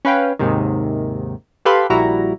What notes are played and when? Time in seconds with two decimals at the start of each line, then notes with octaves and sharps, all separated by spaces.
0.05 C#4 B4 F5 G5
0.39 D#2 G#2 C3 D#3
1.65 G4 A4 B4 F5 B5 C6
1.90 A#1 G3 E4 F#4 A#5